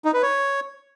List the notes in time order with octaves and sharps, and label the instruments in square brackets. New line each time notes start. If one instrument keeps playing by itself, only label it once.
[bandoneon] D#4
B4
C#5